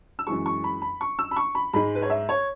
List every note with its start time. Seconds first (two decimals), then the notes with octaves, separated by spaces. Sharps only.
0.19 E6
0.27 F#2 E3 G#3 C#6
0.46 C#6
0.64 B5
0.82 B5
1.01 C#6
1.19 E6
1.31 B5
1.36 C#6
1.55 B5
1.73 G#2 G#3 B5
1.95 B4
2.02 C#5
2.10 E5
2.29 C#5